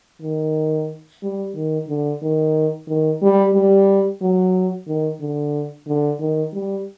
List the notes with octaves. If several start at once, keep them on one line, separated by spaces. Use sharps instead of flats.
D#3
G3
D#3
D3
D#3
D#3
G3
G3
F#3
D#3
D3
D3
D#3
G3